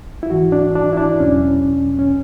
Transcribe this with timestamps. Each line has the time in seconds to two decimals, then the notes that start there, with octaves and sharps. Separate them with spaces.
0.23 E4
0.30 G#2 E3 F#4
0.52 D4
0.75 D4
0.93 E4
0.97 D4
1.20 E2 B2 F#3 C#4
1.99 C#4